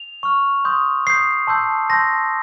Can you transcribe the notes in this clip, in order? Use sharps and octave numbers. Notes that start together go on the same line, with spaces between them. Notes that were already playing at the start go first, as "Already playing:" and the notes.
Already playing: F7
C#6 F6
C6 D#6 G6
C6 D#6 G6 C7
A5 C6 E6 G6
A5 C6 E6 G6 A#6